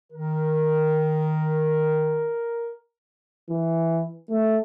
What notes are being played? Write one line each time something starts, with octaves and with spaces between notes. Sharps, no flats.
D#3 A#4
E3
A3